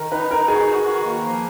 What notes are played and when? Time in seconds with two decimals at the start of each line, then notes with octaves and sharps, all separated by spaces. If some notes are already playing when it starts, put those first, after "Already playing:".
Already playing: D#3 A#4
0.12 D#4 B4
0.31 D#4 A#4
0.48 F#4 G#4
0.68 F#4
0.85 D#3
1.05 A#3
1.23 F3